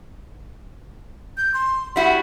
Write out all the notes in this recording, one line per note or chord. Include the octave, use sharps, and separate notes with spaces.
G6
C6
G3 E4 F#4 F#5